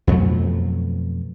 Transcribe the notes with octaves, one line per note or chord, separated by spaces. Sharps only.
F2 B2 F#3 A3